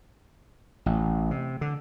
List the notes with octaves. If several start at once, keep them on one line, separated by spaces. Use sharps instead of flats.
A1
C3
D3